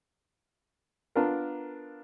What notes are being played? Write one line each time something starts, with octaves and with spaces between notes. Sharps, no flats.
B3 D4 F4 A#4